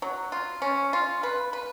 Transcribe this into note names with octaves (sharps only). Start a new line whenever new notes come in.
F#3
F4
C#4
F4
B4
B4